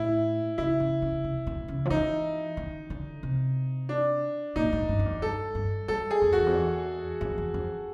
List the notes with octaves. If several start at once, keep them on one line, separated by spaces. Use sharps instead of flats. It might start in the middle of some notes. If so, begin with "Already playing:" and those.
Already playing: A2 E4
C#3 E4
C#3
C#3
C3
B2
C#3
F3
E3 D#4
D#3
D3
C3
D4
A#2 D#4
A2
G2
F2
E2
G2 A4
G2
G2 A4
G#4
F2
F#4
E2
F2
E2
F2
E2
F2